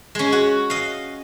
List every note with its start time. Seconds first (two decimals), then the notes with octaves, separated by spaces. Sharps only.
0.15 G#3 C#4
0.32 F#4
0.70 D#5 F5